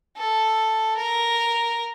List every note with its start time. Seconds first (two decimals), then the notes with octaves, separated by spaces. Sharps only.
0.17 A4
0.97 A#4